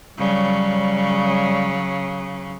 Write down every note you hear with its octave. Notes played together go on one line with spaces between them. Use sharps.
C#3 F#3 G3